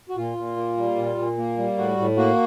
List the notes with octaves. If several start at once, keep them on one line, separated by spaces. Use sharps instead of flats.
F#4
A#2 F4
A#2
A#3
G3
A#2
A#2
A#3
G3
A2 F#4
A2
A#3 F#4